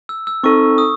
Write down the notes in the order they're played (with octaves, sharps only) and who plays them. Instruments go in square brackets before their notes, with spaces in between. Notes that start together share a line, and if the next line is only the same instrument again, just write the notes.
[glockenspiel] E6
E6
[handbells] C4 D#4 A4 [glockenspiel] C#6
[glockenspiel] D#6